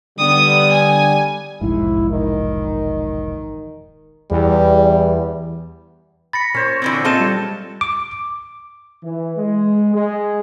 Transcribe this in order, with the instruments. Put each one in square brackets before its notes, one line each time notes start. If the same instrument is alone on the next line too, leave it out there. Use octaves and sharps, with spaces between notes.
[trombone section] D3 G3 [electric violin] B3 D#6
[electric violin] G#5
[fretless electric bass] E1 A#1 G#2 [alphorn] E4
[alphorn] D#3
[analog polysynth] E2 [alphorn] G3
[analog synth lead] B5 [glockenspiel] A6 A#6 C#7
[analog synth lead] A#2 [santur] C#4 C5 C#5
[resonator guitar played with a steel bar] D3 E3 C4
[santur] G#3 [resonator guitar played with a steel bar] C4 F4 A4 [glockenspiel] A5 G6 E7
[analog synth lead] G3
[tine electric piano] D6
[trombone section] E3
G#3
G#3